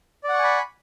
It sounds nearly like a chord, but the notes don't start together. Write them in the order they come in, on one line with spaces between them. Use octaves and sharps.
D5 F#5 C#6 G#5 B5